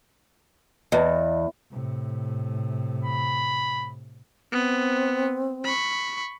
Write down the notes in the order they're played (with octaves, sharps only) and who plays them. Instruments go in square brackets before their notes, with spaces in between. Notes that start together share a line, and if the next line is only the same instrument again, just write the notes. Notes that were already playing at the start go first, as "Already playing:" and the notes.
[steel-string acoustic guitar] E2 [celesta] D#5
[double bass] A2 C3
[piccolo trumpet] B5
[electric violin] B3 [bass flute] C4
[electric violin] B5 C#6